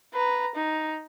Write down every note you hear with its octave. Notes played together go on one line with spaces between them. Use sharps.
B4 A#5
D#4